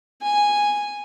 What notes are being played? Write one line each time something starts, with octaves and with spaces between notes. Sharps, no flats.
G#5